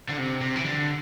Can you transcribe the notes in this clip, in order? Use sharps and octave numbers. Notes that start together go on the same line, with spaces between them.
D3
C3
C3
E3
D3